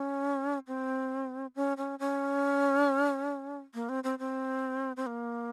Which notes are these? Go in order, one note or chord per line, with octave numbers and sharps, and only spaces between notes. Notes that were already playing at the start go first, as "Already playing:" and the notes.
Already playing: C#4
C4
C#4
C#4
C#4
A#3
C4
C4
C4
C4
A#3